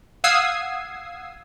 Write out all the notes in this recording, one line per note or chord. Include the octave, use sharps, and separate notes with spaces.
F5 F#5 D#6 E6 G#6 C7